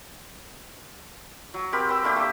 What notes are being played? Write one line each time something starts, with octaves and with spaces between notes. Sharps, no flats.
F#3
C4 G4 A#4 B5
B4 G5 E6
A3 A#3 D4 G4
G3 A#3 E6